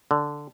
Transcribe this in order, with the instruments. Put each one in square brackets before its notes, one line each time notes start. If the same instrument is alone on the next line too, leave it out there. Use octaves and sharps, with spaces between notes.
[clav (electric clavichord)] D3